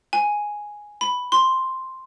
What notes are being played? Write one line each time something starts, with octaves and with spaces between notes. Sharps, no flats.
G#5
B5
C6